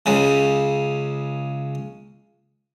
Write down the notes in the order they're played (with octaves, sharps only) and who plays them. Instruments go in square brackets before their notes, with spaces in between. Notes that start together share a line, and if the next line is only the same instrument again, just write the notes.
[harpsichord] C#2 C#3